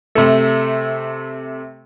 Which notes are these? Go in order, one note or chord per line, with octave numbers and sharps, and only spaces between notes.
C3 A3